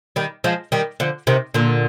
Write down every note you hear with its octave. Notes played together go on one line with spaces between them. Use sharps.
D#3 G3
F3 G#3
D#3 G3
D3 F3
C3 D#3
A#2 D3